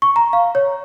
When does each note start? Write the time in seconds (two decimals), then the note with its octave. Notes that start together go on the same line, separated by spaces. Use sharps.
0.02 C#6
0.16 A#5
0.33 F5
0.55 C#5